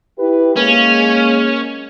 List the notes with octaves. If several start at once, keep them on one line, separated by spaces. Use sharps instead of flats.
E4 G4 B4
G#3 A#3 C#4